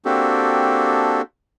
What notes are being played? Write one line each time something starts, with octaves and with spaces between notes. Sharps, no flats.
A#3 C4 D4 F#4 G4 A4